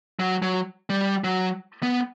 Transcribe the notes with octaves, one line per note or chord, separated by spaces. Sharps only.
F#3
F#3
G3
F#3
B3